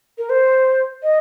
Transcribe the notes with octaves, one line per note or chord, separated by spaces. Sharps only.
A#4
C5
D#5